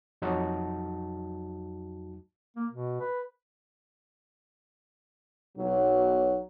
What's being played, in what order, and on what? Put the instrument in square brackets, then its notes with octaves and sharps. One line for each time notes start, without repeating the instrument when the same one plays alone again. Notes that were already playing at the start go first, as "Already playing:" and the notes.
[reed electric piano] F2 F#3 D#4 F#4 A5
[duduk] A#3
B2
B4
[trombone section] B1 [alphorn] F#3